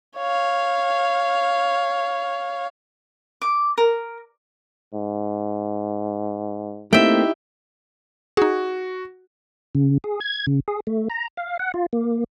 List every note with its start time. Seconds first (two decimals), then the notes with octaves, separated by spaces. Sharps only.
0.18 C#5 F5
3.42 D6
3.78 A#4
4.94 G#2
6.93 A3 A#3 C4 D#4 E4 G4 E5 G5
8.37 D#4 F#4 G#4
9.75 C#3
10.04 G#4
10.20 G#6
10.47 C#3
10.68 G#4
10.87 A3
11.10 A#5
11.37 F5
11.59 F#5
11.74 F4
11.93 A#3